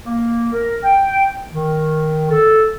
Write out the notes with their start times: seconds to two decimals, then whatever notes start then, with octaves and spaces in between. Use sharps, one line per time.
0.06 A#3
0.53 A#4
0.84 G5
1.53 D#3
2.31 A4